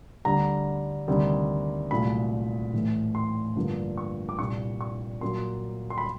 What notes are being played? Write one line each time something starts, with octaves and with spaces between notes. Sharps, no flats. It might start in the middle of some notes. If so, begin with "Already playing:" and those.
D2 D3 G3 A#5
D2 C3 D#3 G3
C2 A#2 F#3 A3 B5
A2 E3 A3
C6
G2 D3 F3 A#3
C#6
D6
C2 A#2 G3 C#6
C#6
A#2 F#3 A#3 C6
C6
B5